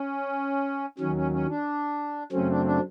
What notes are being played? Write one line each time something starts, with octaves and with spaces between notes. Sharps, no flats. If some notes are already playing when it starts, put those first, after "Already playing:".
Already playing: C#4
D#2 D#3 F#3 C#4
C#4
C#4
D4
F#2 C#3 F#3 A3 C4 C#4
D4
D4